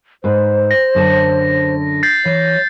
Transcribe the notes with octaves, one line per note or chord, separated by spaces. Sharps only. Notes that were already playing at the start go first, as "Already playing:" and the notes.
G#2 B4 C5
A#6
F#2 D3 A5
G6 A6 C7
E3 C#5